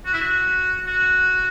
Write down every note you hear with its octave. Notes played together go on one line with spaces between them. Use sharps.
F#4
E4
F#4
F#4